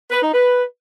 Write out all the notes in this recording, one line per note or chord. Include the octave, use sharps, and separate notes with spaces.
B4
D#4
B4